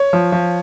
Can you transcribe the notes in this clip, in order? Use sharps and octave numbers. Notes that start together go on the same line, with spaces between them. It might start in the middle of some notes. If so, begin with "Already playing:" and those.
Already playing: C#5
F3
F3